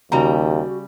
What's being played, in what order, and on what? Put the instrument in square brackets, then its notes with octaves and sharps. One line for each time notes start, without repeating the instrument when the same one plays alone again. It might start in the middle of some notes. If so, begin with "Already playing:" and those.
[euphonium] D#2 [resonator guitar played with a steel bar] C#3 G3 A#5 [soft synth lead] F#4